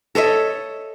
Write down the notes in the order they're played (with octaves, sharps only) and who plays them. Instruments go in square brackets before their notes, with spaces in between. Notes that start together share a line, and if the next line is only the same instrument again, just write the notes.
[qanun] A4 C#5 D#5 E5